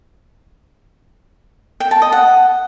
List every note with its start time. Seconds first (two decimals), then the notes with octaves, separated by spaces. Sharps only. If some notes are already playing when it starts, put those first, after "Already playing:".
1.80 G5
1.91 A5
2.02 D#5
2.12 F#5